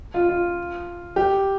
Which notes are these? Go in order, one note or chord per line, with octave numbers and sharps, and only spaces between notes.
F4
F4
G4